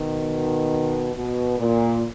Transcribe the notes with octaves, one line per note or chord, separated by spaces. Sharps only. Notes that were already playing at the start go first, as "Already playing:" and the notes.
Already playing: B2 D#3
B2
A#2